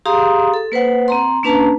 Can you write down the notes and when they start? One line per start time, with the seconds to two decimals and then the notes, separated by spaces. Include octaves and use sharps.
0.06 G4 G#4 F5 A#5 C6 D#6
0.54 A4
0.72 A#3 B4 C5 F#5
1.08 C4 A#5 C6
1.43 A#3 C#4 D4 B4 A5 A#5